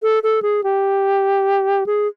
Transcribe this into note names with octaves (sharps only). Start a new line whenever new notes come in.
A4
A4
G#4
G4
G#4